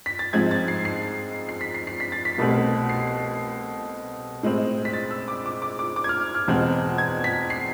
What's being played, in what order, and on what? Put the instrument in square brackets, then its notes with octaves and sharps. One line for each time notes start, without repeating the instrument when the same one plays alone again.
[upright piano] B6
A6
G#2 F3 G#3 C4 G#6
A6
C7
C7
C7
B6
C7
C7
B6
A6
B6
C2 B2 A3 C4
C7
A2 G#3 C4
B6
A6
E6
D6
D6
D6
D6
D6
G#6
F6
F6
E2 B2 G#3 C4
G#6
B6
C7